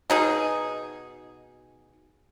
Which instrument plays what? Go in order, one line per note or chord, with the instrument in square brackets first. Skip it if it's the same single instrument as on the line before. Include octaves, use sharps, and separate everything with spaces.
[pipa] B2 D#4 G#4